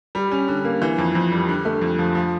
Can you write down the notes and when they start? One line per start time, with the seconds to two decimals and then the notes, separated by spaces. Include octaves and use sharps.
0.15 G3
0.32 C#4
0.48 D3
0.65 A#3
0.82 E3
0.98 F2
1.15 F2
1.32 G3
1.49 D3
1.65 A3
1.81 F2
1.98 F3
2.15 F3